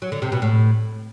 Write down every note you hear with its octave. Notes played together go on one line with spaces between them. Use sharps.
F#3
D3
C3
B2
A2